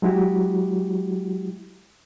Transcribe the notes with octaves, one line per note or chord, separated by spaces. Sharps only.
F#3 G#3 E4 F#4 G4